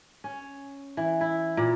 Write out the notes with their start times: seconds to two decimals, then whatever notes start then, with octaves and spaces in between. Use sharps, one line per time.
0.24 C#4
0.97 E3
1.21 E4
1.57 A#2